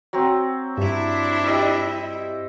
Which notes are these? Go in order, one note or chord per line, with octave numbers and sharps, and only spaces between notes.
F#3 C4
G2 D4 E4 E5
G3 D#5 E6